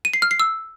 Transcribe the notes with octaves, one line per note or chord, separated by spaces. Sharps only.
D#7
C7
F6
C7
E6